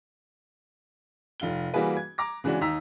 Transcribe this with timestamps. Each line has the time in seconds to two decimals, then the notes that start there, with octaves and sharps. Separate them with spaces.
1.40 F1 F4 G7
1.74 E3 G3 A#3 F#4 G#4 B4
1.97 G#6
2.18 A#5 D6 A#6
2.44 C#3 E3 G#3 D4 F#4
2.61 D#2 D#4 A#5 E6 B6